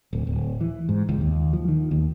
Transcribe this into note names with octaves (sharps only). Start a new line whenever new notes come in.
D1
D1
E3
G#2
C#2
D#2
F3
D#3
D#2